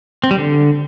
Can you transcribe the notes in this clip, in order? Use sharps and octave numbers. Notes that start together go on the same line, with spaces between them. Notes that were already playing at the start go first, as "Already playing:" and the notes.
C4
G3
D3